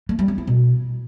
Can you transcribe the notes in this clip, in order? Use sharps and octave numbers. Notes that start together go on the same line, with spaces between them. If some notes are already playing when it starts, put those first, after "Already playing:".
A3
G3
C#4
E4
B2